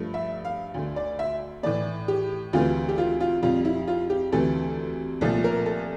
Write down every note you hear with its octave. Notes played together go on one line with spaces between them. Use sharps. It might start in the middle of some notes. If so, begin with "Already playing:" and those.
Already playing: G2 F3 A3
E5
F5
D2 D3 A3
D5
E5
A2 E3 A3 D5
G4
D2 C3 E3 A3 F4
G4
F4
F4
F2 C3 G3 F4
E4
F4
G4
D2 C3 E3 A3 A4
C2 A#2 F3 A3 A4
A#4
A4